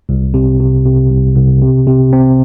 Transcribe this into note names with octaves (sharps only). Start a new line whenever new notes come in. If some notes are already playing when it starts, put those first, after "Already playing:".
C2
C3
C3
C3
C2
C2
C3
C3
C4